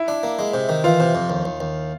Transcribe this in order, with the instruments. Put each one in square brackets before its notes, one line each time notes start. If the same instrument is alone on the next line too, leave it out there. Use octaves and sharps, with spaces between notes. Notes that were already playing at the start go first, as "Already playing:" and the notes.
Already playing: [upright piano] E4
[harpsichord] D4
A#3
G#3
C3
D#3
[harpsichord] E3 [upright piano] F4
[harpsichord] C3
F2
D#2
D#2
D#2